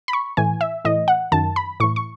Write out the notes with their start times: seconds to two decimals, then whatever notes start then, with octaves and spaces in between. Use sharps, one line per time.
0.08 B5
0.13 C#6
0.37 A2 E3 G#5
0.61 E5
0.85 A2 E3 D#5
1.08 F#5
1.32 F#2 D#3 A5
1.56 B5
1.80 A2 E3 C#6
1.96 C#6